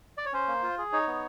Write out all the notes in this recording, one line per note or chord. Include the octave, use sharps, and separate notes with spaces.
D5
C#5
C#4 C5
A#3
F4
G#4
D#4 C#5
B3